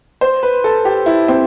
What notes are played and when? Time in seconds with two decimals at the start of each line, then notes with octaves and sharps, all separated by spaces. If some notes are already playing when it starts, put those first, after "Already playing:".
0.21 C5
0.43 B4
0.64 A4
0.85 G4
1.06 E4
1.28 C4